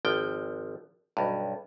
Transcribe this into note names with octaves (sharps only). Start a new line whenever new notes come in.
G#1 F3 G5
B1 G2